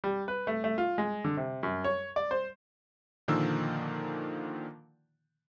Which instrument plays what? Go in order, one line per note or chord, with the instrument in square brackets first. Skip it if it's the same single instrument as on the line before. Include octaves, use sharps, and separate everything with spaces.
[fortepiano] G3
B4
A3
A3
F4
G#3
D3
C3
F#2
C#5
D5
C5
[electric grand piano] A#2 D3 D#3 F3 A#3 E6